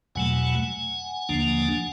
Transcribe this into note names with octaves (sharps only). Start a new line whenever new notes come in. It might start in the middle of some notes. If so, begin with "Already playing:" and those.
E2 B2 F#3 A3 F#5 G#5
D#2 D3 F3 A#3 D4